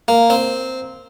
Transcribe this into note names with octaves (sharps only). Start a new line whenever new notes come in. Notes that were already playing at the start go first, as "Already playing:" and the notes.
A#3
C4